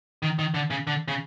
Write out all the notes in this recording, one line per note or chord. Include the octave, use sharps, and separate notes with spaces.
D#3
D#3
D3
C#3
D3
C#3